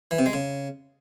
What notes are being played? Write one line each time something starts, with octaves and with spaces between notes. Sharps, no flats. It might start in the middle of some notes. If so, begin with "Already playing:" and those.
E3
C3
G#3
C#3